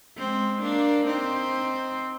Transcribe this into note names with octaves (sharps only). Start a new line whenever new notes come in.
G#3 C4
A#3 D4
C4 D#4